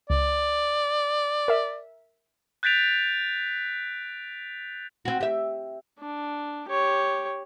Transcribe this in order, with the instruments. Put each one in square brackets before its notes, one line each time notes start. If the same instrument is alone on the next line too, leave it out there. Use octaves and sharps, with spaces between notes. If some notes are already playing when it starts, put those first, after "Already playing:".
[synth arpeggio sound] C#2 [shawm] D5
[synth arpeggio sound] A#4 E5
[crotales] F#6 G6 A6 B6 D7 F7
[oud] C4 F#4
G4 E5
[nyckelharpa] D4
G4 C#5